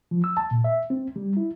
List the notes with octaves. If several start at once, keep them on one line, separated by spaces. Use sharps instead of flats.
F3
E6
A5
A#2
E5
C4
G3
E4